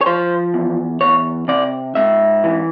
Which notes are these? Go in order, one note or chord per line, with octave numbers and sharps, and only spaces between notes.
C#5
F3 C5
E2
E2 C#5
C3 D5
G#2 E5
E3